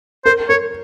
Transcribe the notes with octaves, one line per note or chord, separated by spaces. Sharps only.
A#4 C5
A#4 C#5